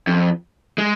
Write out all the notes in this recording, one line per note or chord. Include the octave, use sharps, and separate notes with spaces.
F2
G#3